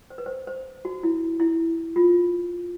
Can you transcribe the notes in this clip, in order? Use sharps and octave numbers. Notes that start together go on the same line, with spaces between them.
C5
B4
C5
C5
F#4
E4
E4
F4